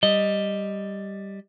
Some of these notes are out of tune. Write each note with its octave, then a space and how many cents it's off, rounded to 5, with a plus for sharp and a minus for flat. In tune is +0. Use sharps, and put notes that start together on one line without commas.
G3 +0 D#5 +0